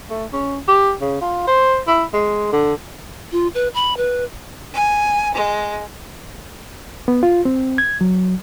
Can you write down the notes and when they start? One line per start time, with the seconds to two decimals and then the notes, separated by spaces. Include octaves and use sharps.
0.10 A3
0.33 C#4
0.68 G4
1.01 C#3
1.21 F4
1.47 C5
1.87 E4
2.13 G#3
2.52 D3
3.32 F4
3.55 B4
3.74 B5
3.97 B4
4.74 G#5
5.33 G#3
7.08 B3
7.23 F4
7.45 C4
7.78 G#6
8.01 F#3